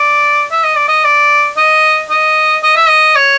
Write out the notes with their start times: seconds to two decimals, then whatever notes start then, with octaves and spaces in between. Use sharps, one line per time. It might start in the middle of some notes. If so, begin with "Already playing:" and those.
Already playing: D5
0.51 E5
0.64 D#5
0.76 D5
0.88 D#5
1.04 D5
1.57 D#5
2.10 D#5
2.63 D#5
2.76 E5
2.88 D#5
3.16 C#5